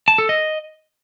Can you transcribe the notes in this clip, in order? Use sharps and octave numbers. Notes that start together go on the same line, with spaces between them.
A5
A4
D#5